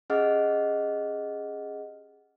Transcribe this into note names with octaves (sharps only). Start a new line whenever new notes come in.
C#4 G4 G#4 D#5 F#5 F6